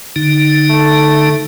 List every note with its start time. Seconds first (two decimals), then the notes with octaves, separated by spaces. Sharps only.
0.16 D3 D#4
0.70 A3